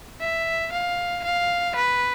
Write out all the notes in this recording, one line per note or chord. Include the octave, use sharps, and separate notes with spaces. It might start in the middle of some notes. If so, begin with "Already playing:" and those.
E5
F5
F5
B4